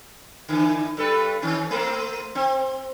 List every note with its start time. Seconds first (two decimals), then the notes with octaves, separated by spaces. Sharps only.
0.48 D3 E3
0.97 G2 A4 B4
1.42 D#3 C#4
1.71 A3 A#3 C4
2.35 C4